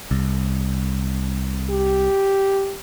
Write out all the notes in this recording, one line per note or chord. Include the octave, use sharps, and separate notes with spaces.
C2
G4